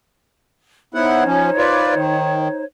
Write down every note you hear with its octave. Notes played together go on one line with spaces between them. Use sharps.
B3 D#4 E4 C5 C#5 F#5
F3 C#4
F4 B4 D5
D#3